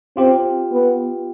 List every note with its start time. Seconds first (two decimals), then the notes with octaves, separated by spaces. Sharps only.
0.17 C4 F4 G4
0.72 B3